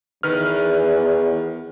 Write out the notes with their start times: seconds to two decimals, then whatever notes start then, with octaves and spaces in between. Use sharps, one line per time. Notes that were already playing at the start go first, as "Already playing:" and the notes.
0.23 E2 D#3 B4 F6